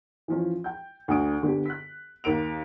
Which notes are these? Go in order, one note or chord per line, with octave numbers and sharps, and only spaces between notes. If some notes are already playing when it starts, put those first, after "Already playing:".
E3 F3 C#4
G5 G6
D2 D4 D#6 D7
D3 B3 G4
F#6 B6
D#2 A#4 D7 F7